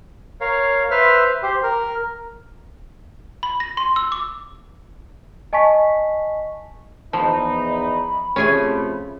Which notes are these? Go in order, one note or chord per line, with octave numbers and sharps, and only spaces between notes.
A#4 C#5 F5
B4 C5 E5 F6
G4 C5
A#4
B5
A#6
C6
E6
D6
D#5 G#5 A5 C#6 B6
E2 F3 D#4 A5 B5
C3 F3 A3 C#4 G#4 G#5